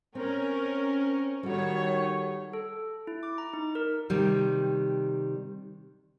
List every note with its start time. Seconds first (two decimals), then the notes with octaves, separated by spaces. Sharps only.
0.15 C4 C#4 A#4
1.43 D#3 G3 F#4 A4 C#5
2.53 A4
3.07 E4
3.23 D6
3.38 A#5
3.53 D#4
3.75 A#4
4.10 C3 D#3 G3